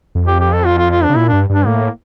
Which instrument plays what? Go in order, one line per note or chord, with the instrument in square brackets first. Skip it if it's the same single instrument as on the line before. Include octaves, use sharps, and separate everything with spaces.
[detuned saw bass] F2
[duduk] G4
G4
A4
F4
F4
F4
D4
[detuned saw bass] C#3
[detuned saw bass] A#2 [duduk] E4
[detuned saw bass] G2 [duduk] D4
[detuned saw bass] G2 [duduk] D4
[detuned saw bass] A2 [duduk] A#3